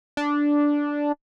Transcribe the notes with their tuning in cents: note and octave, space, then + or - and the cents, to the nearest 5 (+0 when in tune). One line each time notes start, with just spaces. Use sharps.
D4 -5